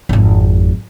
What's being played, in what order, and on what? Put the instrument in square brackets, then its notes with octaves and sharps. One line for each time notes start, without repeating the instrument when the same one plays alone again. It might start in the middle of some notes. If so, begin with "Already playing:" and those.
[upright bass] G#1 F2